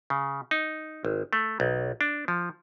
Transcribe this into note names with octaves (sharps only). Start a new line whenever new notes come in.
C#3
D#4
G#1
A3
B1
D4
F3